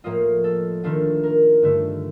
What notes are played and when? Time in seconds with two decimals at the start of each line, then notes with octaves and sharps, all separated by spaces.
0.04 A2 F3 A#3 F4 D#5
0.44 A4
0.84 D#3 A3 D4 F4
1.23 A#4
1.62 G2 D3 A3